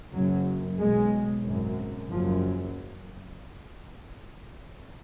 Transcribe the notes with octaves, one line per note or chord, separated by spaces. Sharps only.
F#1 F#2 F#3
B1 B2 G#3
G#1 F#2
F#1 F#2 F3